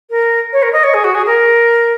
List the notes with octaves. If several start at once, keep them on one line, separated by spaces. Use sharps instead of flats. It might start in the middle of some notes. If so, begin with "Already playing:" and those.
A#4
C#5
A#4
D#5
C#5
G#4
F#4
G#4
A#4